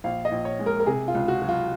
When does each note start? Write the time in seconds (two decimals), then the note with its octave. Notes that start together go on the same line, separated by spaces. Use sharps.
0.04 A#1 F5
0.25 D#5
0.32 A#1
0.45 C#5
0.59 G#3
0.66 A#4
0.80 A#4
0.87 C3 G#4
1.08 F4
1.15 C#2
1.28 F#4
1.42 F#3
1.49 F4